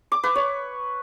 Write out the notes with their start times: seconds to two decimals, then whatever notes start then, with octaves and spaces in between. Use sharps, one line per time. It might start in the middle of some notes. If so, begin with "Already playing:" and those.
0.12 D6
0.23 B4
0.35 C#5